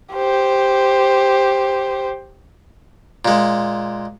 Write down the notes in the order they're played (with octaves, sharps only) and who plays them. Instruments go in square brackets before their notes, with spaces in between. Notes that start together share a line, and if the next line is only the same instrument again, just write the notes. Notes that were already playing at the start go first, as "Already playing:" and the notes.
[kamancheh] G4 C5
[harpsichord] A#2 G#3